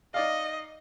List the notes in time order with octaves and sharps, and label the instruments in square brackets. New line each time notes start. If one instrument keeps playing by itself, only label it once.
[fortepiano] D#4 D5 F5 [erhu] D#5